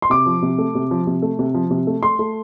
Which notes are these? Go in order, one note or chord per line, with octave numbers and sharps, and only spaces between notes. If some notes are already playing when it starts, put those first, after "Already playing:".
C6
C3 D6
F3
C3
A3
C3
F3
C3
A3
C3
F3
C3
A3
A3 C6
A3